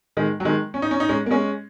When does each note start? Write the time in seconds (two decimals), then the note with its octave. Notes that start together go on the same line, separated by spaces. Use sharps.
0.17 D#3 G#3
0.40 F#3
0.45 D#3 G#3
0.74 C#4
0.82 D#4
0.91 C#4
1.00 D#4
1.09 G#3 C#4
1.26 A#3
1.31 G#3 C#4